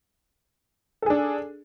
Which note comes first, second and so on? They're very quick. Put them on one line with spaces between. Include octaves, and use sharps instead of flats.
A4 G#4 D4